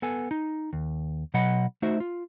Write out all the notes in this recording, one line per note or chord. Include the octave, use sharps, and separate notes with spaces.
B3 A4 G#5
D#4
D#2
B2 F#3 D#5 F#5 B5
A3 D#4 F#4 C5 E5
F4